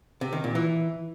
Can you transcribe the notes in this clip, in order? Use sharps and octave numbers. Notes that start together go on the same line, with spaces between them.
C3
D#3
A#2
E3